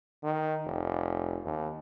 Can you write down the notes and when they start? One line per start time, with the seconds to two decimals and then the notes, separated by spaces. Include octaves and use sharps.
0.23 D#3
0.65 F1
1.45 D#2